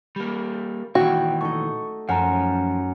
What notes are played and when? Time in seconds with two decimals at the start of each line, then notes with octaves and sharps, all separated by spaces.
0.16 G3 A#3
0.95 A#2 D#3 E3 F#4 G5
1.41 A3 D#4 C#6
2.09 F#2 F3 F#5 G#5 A#5